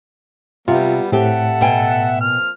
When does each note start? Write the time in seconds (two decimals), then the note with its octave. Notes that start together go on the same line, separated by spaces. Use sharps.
0.68 C3 F#3 G3 B3 F4
1.12 A2 C4 G4 A4 E5 F#5
1.61 B2 G5 G#5
2.21 F3 A#3 C4 F6